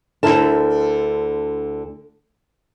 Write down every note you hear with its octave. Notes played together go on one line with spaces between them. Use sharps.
D2 G2 D3 E4 A#4 A5